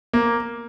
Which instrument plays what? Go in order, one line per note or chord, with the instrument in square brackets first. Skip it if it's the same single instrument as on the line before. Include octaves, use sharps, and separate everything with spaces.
[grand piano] A#3